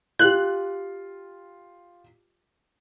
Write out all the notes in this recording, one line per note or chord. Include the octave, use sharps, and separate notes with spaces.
F4 G4 F#6